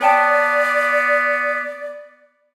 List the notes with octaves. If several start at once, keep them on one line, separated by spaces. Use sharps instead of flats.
B3 C#5 D5 G5 A5